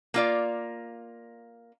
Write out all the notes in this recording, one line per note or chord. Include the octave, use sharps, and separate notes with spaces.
A#3 F4 D5